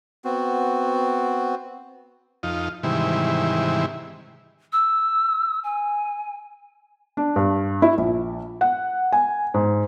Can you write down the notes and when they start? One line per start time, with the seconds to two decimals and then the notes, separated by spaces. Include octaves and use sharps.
0.25 B3 C4 F#4
2.43 F2 D#4 F4
2.83 G#2 C3 D#3 E3 G3 E4
4.73 E6
5.64 G#5
7.17 D4
7.36 G2
7.82 E4
7.98 A#1
8.61 F#5
9.13 G#5
9.54 G#2